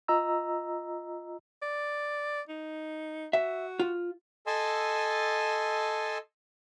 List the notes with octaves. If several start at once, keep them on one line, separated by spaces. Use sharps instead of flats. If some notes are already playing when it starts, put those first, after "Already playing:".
F4 D#5 A#5 E6
D5
D#4
F#4 E5
F4
A4 D#5 G#5 A5 C6 E6